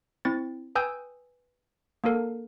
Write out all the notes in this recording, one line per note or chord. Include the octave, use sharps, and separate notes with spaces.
C4 E4 A6
B4 G5 G#5 D#6 E6 G6
A#3 D4 A4 A#4